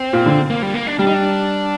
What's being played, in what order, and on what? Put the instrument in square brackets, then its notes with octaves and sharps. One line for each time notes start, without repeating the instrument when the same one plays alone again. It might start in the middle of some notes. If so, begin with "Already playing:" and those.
Already playing: [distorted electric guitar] C4
[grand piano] A#2
D3
[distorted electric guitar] A#3
G3
A#3
D4
[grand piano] G3 [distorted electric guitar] D4
[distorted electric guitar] D#4
D4